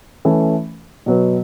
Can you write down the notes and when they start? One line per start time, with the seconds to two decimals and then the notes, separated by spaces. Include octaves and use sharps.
0.25 E3 A3 C#4
1.06 B2 F#3 B3